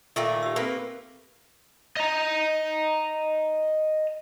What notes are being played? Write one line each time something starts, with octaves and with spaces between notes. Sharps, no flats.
A#2 D#3 A3 F4 A4 F5
G4 E6
A#3 C4 A4 B4 F5
D#5 A#5